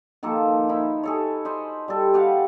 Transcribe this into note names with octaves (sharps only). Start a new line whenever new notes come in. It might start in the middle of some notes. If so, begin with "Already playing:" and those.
D#3 F3 A#3 A4
D#4 E4 B5
G#4 A4 C#5
C5 D#5 B5 C6
G3 A4
G4 B4 F5 F#5